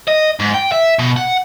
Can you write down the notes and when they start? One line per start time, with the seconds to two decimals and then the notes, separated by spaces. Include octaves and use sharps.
0.08 D#5
0.40 G#2
0.54 G5
0.72 E5
0.99 B2
1.16 F#5